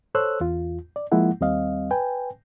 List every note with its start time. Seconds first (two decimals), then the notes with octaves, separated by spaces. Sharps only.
0.15 A4 C5 C#5 E6 F#6
0.41 E2 F4
0.96 D5
1.12 F3 G#3 A#3 E4 F#5
1.41 D#2 G3 C4 D#5 F5
1.91 B4 G5 G#5